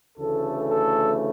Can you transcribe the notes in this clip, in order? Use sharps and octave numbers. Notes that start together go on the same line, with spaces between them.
D2 C#3 E3 A3 A4
A4